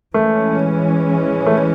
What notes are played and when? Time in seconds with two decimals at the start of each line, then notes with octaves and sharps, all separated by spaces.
0.14 E3 G#3 A3 C#4
1.46 A3